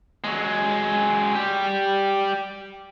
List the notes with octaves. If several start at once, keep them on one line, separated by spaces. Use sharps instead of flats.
F#3 G#3
G3 G4